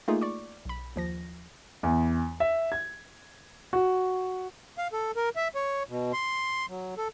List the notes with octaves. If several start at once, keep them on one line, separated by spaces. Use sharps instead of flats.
A3 A#3 D#4 F4 G#4
D5 C#6 D6
B1 B5
D#2 F3 A#6
E2
E5
G#6
F#4
F5
A4
A#4
E5
C#5
B2
C6
F#3
A4